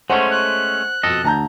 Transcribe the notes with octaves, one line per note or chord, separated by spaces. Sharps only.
G#3 A3 C#4 C5 F#5
F#6
F2 B2 A4 D#5
D2 A5 A#5 G6